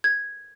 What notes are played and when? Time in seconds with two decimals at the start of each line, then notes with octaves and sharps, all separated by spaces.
0.04 G#6